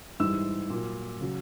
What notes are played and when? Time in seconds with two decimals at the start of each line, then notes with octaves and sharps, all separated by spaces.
0.20 G#2 E3 G3 E6
0.70 A#2 F#3 A#3
1.21 C#3 F#3